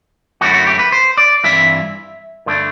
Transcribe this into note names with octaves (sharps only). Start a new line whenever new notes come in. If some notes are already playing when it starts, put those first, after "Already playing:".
F#2 D3 A3 E4 F#4
F#4
G4
B4
C5
D5
G2 E3 G3 C4 E4 E5
G2 D3 A3 D4